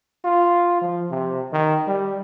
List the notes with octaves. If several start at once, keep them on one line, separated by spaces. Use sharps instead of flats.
F4
F3
C3
D#3
G3